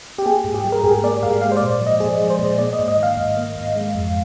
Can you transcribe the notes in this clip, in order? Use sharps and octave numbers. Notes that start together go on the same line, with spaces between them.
G4
A#3 G#4
G#2
G4
G3
A#4
G#2 G#4
A#3 D5
G#2 F5
G#3 F5
C5
A#2 D5
F3
D#5
A#2 G#4
G#3
C5
A#2
A#3 D5
D#5
G#2
D#5
D#3
F5
G#2
A#3
G#2
G#3
F2